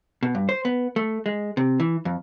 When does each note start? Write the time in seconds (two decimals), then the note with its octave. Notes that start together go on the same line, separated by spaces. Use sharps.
0.23 B2
0.35 G2
0.49 C5
0.65 B3
0.96 A3
1.26 G#3
1.57 C3
1.80 E3
2.05 F2